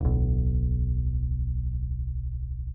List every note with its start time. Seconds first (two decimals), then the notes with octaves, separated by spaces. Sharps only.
0.01 D1 B1